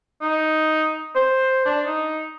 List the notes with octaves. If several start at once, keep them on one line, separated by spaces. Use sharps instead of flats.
D#4
C5
D4
D#4